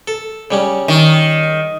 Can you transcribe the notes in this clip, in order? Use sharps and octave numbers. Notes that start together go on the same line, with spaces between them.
A4
C#3 G3 C#4
D#3